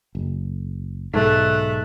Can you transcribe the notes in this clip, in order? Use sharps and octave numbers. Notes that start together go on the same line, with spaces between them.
F#1
B1 G#2 A3 F#6